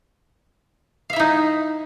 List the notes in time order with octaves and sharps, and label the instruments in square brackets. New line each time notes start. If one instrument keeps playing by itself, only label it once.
[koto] F5
E5
E4
D#4